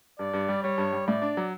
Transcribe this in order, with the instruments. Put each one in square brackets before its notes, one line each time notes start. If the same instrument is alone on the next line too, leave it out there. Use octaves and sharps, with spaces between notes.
[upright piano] G2 [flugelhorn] D5
[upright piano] G2
G3
[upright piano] G3 [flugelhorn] C#5
[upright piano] G2
G3
[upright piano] A2 [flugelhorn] D5
[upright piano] D4
F#3